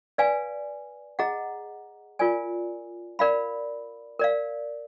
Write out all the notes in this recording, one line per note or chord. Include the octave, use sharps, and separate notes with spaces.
B4 D5 F5 G#5
G#4 D#5 F#5 A#5
F4 A#4 D5 G#5
A#4 D5 F5 B5
A#4 D5 F5